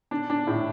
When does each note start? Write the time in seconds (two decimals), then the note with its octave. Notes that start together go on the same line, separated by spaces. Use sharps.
0.11 D4
0.30 D4
0.47 A2